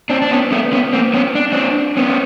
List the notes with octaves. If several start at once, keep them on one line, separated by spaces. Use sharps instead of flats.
C4 D4
D4
B3 C#4
A3 B3
B3 C#4
A#3 C4
B3 C#4
D4
C4 D4
B3 C#4